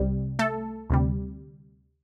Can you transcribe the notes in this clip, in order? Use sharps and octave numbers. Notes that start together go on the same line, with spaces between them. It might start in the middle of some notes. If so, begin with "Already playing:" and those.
Already playing: C2 C3 G3
A3 A4
D2 C3 G3